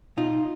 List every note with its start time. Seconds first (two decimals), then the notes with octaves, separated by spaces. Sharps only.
0.17 B2 D#4 F4